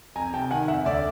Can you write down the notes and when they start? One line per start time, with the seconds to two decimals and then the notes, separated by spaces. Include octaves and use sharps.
0.15 F2 G#5 A#5
0.33 C3 G5 A5
0.50 D#3 F#5 G#5
0.68 F2 E5 F#5
0.85 D2 D5 E5